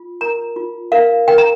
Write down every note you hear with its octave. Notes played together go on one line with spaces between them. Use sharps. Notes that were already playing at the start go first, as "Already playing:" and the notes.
Already playing: F4
A#4 A#5
F4
A#4 F5
A#4 G5
A#5